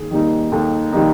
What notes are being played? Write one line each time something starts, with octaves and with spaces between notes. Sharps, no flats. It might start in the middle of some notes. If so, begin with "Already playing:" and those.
Already playing: D#2 G#4
D#3 G3 A#3 D#4
D#2 A4
D#3 G3 A#3 D#4